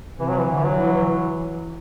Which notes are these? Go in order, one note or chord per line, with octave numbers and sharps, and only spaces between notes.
C3 E3
F#3
E3
D3
E3
F#3
E3